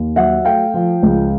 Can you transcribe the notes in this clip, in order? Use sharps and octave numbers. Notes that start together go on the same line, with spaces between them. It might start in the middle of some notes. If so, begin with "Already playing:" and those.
Already playing: D#2
F#3 E5 F#5
A3 F5 G5
F3
C#2